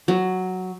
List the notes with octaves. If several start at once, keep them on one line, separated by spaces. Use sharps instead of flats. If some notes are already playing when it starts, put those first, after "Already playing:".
F#3